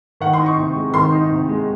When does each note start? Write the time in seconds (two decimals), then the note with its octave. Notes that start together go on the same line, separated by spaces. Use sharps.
0.21 D#3 F#5
0.33 C6
0.40 D#4
0.46 C#6
0.57 C3
0.75 G#3
0.94 D#3 C6
1.12 D#4
1.30 C3
1.49 G#3